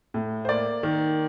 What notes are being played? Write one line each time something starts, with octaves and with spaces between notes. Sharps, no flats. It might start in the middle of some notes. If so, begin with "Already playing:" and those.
A2
C5
A#3 D5
D#3